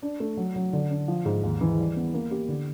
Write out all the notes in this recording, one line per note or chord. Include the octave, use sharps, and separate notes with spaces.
D4
A3
F#3
F#3
D3
D4
F3
G#2
D#2
E3
G3
B3
A#3
G4
D3